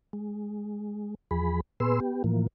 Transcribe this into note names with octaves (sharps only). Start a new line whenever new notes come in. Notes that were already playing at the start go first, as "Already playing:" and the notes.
G#3
E2 F3 G#4 B5
A#2 B3 G#4 B4 C6 E6
B3 G4
A2 E3 F3 A#3